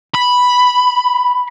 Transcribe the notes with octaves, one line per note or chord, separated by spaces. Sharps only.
B5